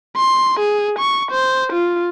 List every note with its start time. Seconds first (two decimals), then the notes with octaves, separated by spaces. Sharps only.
0.16 C6
0.60 G#4
0.99 C#6
1.31 C5
1.73 F4